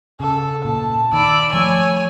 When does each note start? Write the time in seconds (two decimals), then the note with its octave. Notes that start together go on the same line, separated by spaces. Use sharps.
0.20 C#3 A4
0.65 A#2 A5
1.13 D#3 D5 B5 E6
1.54 F3 A3 C#5 G#5